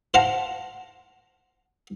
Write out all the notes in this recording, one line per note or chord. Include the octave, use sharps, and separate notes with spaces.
C5 F5 F#5 A5 A#5